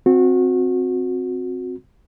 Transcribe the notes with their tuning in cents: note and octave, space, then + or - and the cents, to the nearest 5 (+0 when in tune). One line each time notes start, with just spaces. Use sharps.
C4 +0 F#4 -25